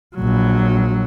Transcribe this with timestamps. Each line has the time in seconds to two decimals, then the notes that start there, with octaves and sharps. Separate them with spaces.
0.16 A#1 F#3